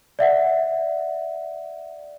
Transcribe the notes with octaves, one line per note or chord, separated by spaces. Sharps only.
D5 E5 F#5